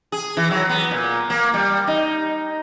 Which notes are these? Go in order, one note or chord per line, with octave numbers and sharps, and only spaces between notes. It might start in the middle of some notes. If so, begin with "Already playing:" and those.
G#4
E3
F#3
B3
A#2
A#3
G3
D#4